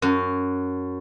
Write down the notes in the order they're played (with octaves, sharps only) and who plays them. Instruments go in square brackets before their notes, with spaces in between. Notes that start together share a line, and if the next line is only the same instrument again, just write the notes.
[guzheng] F#2